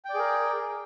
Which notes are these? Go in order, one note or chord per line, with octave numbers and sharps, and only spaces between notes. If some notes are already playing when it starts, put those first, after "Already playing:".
G#4 A#4 D5 G5